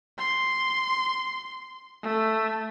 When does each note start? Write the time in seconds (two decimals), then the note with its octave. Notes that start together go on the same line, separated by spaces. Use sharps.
0.19 C6
2.03 A3